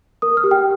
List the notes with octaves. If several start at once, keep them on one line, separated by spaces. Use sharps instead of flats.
A#4 D#6
F6
G4
G5